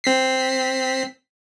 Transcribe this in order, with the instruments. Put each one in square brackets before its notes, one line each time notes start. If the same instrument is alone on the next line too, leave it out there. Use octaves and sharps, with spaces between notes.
[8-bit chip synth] C4 B6 C7